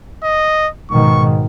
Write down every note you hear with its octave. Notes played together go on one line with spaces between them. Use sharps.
D#5
G#2 B2 D#3 C#6